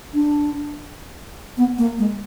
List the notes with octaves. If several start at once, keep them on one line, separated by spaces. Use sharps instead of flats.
D4
B3
A#3
G#3